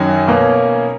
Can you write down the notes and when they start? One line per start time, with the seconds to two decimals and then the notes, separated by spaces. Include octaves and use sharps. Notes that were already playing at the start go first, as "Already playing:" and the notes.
Already playing: F#2 D#3 F#3 G#5
0.28 B2 A#3 C#4